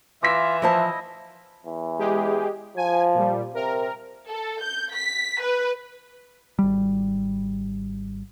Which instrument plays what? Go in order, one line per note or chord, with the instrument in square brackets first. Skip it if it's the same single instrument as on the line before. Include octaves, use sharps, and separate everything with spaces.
[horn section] E3 E5 [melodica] F4 [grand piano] D6 A#6 B6
[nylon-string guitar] F3 C5 A5 [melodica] E4 D#5
[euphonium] E2
[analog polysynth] G#3 G4 G#4
[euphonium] F3 [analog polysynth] G#5
[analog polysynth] A#2 G3
[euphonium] C3 [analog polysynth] A#4
[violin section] A4
G6
B6
B4
[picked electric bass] G#1 G3